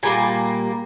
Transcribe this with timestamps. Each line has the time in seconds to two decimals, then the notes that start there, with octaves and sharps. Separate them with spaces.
0.03 A#2 G3 A#3 G#5